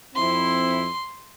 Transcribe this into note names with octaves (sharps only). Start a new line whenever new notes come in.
F2 C4 E4 C6